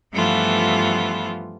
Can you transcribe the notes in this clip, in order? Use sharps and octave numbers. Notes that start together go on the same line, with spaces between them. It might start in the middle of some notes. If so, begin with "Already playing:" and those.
G2 E3 F3 A3 B3 F4